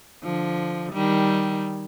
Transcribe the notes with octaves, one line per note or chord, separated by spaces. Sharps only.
D3 F3
D#3 G3